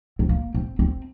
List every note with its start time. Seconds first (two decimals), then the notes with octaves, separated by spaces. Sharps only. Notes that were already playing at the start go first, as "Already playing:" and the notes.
0.19 C4
0.29 A#3
0.55 C4
0.79 C4